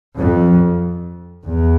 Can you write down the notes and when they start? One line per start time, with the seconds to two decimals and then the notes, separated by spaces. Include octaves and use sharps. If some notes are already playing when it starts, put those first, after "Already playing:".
0.16 F2
1.46 E2